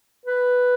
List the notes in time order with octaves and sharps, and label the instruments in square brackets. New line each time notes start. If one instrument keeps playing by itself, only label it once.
[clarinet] B4